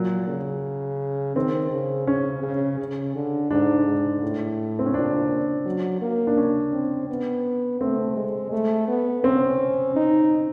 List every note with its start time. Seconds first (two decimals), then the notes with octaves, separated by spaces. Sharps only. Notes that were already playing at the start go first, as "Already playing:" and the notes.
Already playing: A#2 F#3
0.28 C#3
1.35 D#3 C4
1.71 C#3
2.07 C#3 C#4
2.43 C#3
2.79 C#3
3.15 D3
3.51 G#2 D4
3.87 G#2
4.22 A2
4.79 C4
4.86 C#4
4.94 A#2 D4
5.66 F#3
6.01 A#3
6.27 D4
6.37 C#4
6.73 C4
7.09 B3
7.81 A3 C4
8.16 G#3
8.52 A3
8.88 B3
9.23 C4 C#4
9.96 D#4